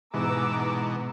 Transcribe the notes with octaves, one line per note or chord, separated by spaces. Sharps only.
G#2 B2 E3 A#5 D6 E6